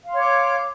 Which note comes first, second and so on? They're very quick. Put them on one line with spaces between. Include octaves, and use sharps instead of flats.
F5 C6 C#5 D6